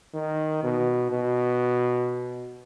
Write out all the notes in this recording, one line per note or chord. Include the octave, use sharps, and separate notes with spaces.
D#3
B2
B2